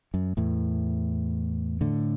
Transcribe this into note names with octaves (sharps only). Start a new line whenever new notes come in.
F#2
E2 A2
A2 D3